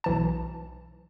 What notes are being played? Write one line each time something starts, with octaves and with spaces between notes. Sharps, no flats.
B1 E3 A5